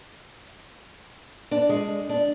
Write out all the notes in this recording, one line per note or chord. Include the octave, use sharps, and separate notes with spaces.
D4
G#3
D4